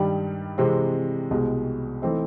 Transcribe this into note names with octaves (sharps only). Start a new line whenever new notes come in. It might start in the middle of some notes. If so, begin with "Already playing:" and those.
Already playing: G2 D#3 G3
C3 E3 G#3 C4
C2 B2 G#3
E3 A3 C4 D#4